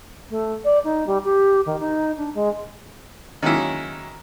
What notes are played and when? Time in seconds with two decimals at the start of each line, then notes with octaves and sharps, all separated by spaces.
0.29 A3
0.64 D5
0.84 D#4
1.06 G3
1.24 G4
1.65 D#3
1.79 D#4
2.16 D4
2.34 G#3
3.43 D#3 F#3 G#3 A#3 C#4 E4